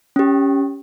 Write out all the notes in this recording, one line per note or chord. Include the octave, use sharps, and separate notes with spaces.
C#4 G4